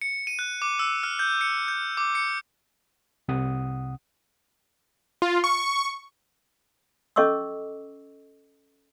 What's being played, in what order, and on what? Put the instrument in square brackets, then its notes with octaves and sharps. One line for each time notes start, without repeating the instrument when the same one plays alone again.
[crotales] C#7
D#7
F#6
D6
E6
F6
G6
C#7
G6
D6
C#7
[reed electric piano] C2 C3 F#5 D#6
[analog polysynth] F4
C#6
[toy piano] C#4 A4 D#5 C#6 D6 E6